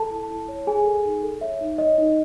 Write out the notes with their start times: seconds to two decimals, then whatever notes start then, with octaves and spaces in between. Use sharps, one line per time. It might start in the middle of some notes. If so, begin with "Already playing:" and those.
Already playing: A4 A5
0.10 E4
0.30 E4
0.48 C#5
0.67 G#4 A4 G#5
0.85 A4
1.05 D#4
1.23 A4
1.41 C#5 E5
1.61 D#4
1.78 C#5 D#5
1.98 D#4